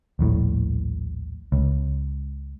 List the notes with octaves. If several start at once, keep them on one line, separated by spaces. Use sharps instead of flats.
D#1 A#1 A2
C#2